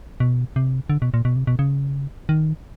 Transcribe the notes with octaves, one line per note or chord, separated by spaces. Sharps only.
B2
C3
D3
B2
A#2
B2
C3
B2
C#3
D#3